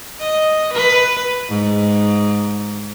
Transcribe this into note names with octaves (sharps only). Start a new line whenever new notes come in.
D#5
B4
G#2